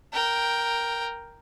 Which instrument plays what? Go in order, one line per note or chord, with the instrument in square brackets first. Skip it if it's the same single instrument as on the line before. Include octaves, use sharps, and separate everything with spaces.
[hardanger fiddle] A#4 G5